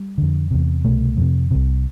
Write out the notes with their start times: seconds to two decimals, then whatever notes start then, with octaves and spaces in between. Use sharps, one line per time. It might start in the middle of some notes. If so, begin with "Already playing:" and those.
Already playing: G3
0.18 F2 D3
0.51 E2 C3
0.84 C2 B2 A3
1.17 F2 C3
1.51 C2 C3